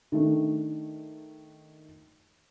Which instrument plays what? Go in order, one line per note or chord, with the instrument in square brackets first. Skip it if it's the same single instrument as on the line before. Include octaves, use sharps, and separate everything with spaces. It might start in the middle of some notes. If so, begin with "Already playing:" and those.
[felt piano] D#3 A3 D4